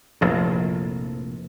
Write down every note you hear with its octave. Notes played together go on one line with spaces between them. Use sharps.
F1 A#1 A2